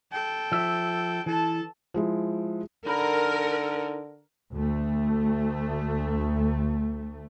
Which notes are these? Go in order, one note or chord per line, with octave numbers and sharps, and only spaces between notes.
A4 G5
F3 E5
E3 A4 A5
F3 G#3 E4
D3 D#4 A#4 A#5 B5
D2 A3